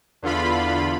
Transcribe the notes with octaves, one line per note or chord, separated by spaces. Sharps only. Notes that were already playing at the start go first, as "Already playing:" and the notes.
E2 D3 F4 B5